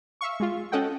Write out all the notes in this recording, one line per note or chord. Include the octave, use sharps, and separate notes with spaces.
E5 F5 C#6
G#3 F4
C#4 F#4 A4 D#5 F#5 G5